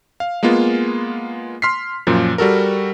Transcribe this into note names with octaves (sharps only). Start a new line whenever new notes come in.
F5
G#3 A#3 B3 F4
C6 F6 B6 C7
F#2 A#2 F3
G3 F#4 A4 A#4